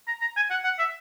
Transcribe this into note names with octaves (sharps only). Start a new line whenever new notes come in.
A#5
A#5
G#5
F#5
F#5
E5